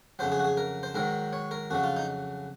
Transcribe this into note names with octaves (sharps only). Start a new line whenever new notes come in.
F2 C#3 F#3 C5
G#4
F#4
G#4
A#4
C5
G#2 D#3 F#3 A#4
C#5
A#4
F2 C#3 F#3 F#4
F4
D#4